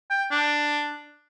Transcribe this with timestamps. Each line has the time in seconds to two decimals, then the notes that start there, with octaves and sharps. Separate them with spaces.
0.10 G5
0.31 D4